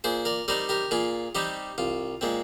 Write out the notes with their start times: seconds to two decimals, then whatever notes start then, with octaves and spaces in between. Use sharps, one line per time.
0.04 A#2 G#4 C5
0.25 A#4 D5
0.48 G3 C4 D#4 A#4 D5
0.69 G4 A#4
0.91 A#2 F4 G#4
1.35 G3 C4 D#4 G4
1.78 C2 F4
2.21 A#2 G#3 C4